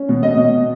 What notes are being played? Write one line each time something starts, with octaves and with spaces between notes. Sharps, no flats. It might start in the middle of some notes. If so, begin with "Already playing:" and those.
Already playing: C#4
B2
D#5
B2